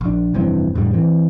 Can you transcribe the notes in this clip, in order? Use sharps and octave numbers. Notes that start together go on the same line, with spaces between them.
A#1 D4
F1 G2 E3 C4
F2 A2 D3 G3
E3 C4